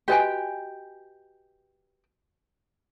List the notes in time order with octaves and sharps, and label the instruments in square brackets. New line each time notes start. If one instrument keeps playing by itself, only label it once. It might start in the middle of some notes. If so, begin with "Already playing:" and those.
[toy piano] F#4 D#5 G#5 [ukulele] G4 B4 G5